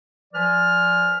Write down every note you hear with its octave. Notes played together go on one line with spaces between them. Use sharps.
F3 B4 D5 G#5 F6